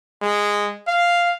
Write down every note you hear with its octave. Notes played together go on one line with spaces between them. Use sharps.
G#3
F5